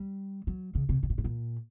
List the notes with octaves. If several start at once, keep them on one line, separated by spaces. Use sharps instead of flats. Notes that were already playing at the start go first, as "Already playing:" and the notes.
Already playing: G3
F#3
C#3
C3
B2
A#2
A2
A#2